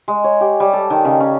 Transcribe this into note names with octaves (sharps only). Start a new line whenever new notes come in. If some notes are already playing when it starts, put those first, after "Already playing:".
G#3
C#5
G4
G3
A4
D#3
C#3
C#4